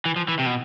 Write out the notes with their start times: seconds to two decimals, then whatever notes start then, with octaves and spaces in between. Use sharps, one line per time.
0.05 E3
0.16 F3
0.28 E3
0.39 C3
0.46 B2